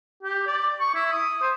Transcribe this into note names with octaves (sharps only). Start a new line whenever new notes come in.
G4
D5
C#6
E4
D#6
C5